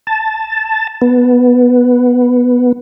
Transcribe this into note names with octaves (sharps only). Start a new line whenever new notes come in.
A5
B3